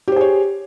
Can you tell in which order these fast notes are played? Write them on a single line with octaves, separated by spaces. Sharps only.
G4 C5 G#4 C#5